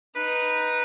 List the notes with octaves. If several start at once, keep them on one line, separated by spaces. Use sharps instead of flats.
D#4 B4